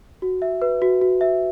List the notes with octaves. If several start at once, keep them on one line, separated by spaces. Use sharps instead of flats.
F#4
E5
B4
F#4
F#4
E5